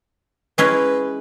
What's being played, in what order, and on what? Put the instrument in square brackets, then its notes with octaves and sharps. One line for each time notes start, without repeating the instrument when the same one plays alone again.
[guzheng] G#3 C#4 E4 [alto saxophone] B4